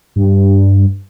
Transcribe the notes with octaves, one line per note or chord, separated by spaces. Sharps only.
G2